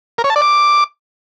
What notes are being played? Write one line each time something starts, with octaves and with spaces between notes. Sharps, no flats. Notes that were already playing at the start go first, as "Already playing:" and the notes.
A#4
C#5
A5
D5
D6